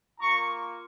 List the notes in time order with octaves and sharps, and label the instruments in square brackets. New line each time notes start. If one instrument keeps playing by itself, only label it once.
[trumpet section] A#3 F4 A#5 C#6